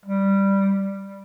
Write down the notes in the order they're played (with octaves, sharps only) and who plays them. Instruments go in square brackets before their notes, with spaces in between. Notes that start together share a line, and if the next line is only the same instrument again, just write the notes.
[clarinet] G3